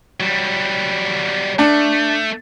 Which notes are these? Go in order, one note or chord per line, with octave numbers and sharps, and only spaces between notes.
F#3 G3
A3 D4